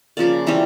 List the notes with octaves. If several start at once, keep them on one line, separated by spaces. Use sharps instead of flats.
C#3 F3 A#3 D5
C3 E3 G3 C4